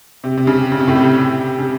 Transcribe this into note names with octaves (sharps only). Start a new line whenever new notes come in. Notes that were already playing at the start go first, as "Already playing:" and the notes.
C3
C3
C#3
C#3
C3
A2
C3
C#3